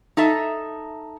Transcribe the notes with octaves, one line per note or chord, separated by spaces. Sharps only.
D#4 A4 E5